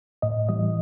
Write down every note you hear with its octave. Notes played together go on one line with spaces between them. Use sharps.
A2 D#5
E3 G3 D#5